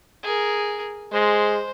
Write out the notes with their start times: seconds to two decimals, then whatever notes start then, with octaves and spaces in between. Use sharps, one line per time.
0.23 G#4 A#4
1.12 G#3 C5